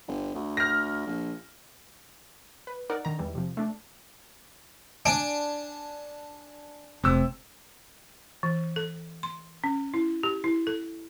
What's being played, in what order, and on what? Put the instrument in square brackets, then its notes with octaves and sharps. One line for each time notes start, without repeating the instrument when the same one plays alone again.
[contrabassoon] G1
D2
[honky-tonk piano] F6 A#6
[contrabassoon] A#1
[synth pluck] B4
D#4 A#4 D5 F#5
D3 D#3 A#5
E2 E3 G3 G#3
C3 F3
A3 D4
[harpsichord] D4 [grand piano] G#5 D7
[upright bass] F1 [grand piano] C3 E6
[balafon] E3
A4
C6
C#4
E4
G4
E4
A4